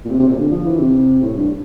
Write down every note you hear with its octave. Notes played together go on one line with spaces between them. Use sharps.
A#2
C3
C3
A#2
D3
F3
E3
C3
A2
G2